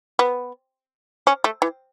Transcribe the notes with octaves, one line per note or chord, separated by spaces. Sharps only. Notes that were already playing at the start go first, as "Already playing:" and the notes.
B3
C#4
A3
E3